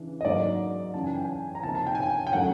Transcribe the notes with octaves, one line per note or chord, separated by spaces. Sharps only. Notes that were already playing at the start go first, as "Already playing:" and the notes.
Already playing: C#3 E3 D4
D#5
G#2 D#3 F#3 A#3 D#4 D5
F#2 C#3 E3 A5
G#5
G5
G#5
A#5
C3 F3 A#3 D#4 A5
A5
G5
G#5
G5
G5
D#3 F#3 A3 C#4 F#5